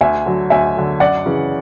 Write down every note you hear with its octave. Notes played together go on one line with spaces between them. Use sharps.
D2 E5 G#5
D3 F#3
D2 E5 G#5
D3 F#3
F#2 D5 F#5
C#3 E3